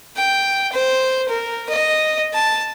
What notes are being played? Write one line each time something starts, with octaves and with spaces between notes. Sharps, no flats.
G5
C5
A#4
D#5
A5